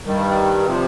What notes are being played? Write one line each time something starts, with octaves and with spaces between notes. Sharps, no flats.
G2 D#3 G3
C3 F3